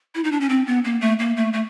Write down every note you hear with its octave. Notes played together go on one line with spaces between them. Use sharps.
E4
D#4
D4
C#4
C4
B3
A#3
A3
A#3
A3
A3